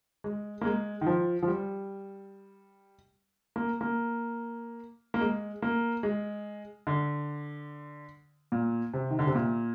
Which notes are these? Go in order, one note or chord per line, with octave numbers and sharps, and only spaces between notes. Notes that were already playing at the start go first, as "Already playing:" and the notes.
G#3
A#3
G#3
D#3
F3
F3
G3
A#3
A#3
A#3
G#3
A#3
G#3
D3
A#2
C3
D#3
D3
C3
A#2